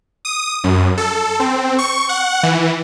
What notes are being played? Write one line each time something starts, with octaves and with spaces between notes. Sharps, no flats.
D#6
F#2
A4
C4
C#6
F#5
E3